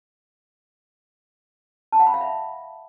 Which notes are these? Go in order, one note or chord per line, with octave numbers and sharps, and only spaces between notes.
A5
F#5
B5
F5
E5